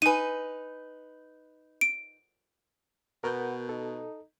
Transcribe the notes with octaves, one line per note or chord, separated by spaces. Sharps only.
D#4 B4 G#5 D#7
D7
B2 B3 A#4 G6
D#4 A4